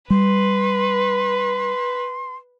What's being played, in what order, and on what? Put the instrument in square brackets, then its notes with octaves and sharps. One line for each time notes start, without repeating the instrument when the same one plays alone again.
[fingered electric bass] G3 [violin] B4 [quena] C6